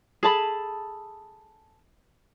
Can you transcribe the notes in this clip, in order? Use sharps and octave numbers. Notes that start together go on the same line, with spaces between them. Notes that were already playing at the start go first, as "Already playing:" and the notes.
G#4 A4 A5 B5